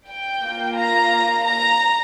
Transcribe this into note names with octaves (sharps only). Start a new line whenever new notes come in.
G5
A#3 F4
A#5
A#5